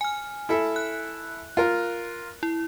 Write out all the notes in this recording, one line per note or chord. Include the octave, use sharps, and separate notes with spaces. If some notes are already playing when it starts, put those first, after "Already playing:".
G#5 F6
E4 A4 E5
F#6
F4 A#4
E4